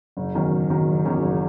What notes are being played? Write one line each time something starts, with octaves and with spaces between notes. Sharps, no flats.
F#1
E2 D#3 F#3 C#4
F#1
E2 D#3 F#3 C#4
F#1
E2 D#3 F#3 C#4
F#1